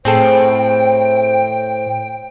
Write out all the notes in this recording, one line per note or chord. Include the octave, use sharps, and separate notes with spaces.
A2 C4 G#4 A4 C5 G5